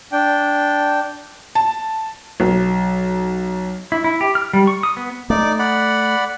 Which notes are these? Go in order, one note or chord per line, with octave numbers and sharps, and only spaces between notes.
D4 G5
A5
B1
E4
E4
G4
F6
G3
C#6
D#6
B3
A3 D#4 D5 D6
D5 F#5 B5